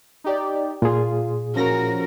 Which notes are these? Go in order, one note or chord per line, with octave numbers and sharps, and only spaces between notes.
D#4 G4 D5
A#2 F4 G#4
F3 C#4 F#4 A#4 A#6